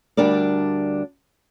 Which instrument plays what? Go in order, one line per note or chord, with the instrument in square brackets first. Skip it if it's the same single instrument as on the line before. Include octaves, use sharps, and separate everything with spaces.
[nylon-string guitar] D2 G3 D4 A#4 D5